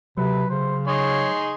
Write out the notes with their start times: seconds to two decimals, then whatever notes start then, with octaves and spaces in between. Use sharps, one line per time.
0.18 C3 F#3 B4
0.50 C#3 C5
0.87 D#4 G#4 C#5 C6